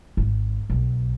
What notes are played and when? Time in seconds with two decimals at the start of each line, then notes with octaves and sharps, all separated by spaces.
0.17 G#1
0.70 B1